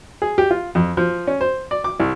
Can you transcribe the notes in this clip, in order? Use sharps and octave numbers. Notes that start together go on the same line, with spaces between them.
G#4
G4
F4
F2
F3
C#4
C5
D5
D6
C2